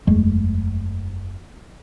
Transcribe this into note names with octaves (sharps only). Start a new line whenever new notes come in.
F#1 E2 G#3 A3